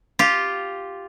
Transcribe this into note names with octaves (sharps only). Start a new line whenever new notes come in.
F4 G4